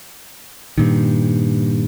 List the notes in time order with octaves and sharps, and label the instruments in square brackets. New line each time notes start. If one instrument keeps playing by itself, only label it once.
[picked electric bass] G2 A#2 D#3